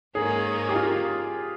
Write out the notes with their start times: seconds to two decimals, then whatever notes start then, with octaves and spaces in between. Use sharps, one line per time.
0.15 G#2 D#3 A#3 C#4 G#4
0.69 G4
0.75 F4